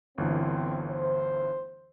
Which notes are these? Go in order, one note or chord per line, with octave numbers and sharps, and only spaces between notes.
G1 D2 B2 E3 C4
C5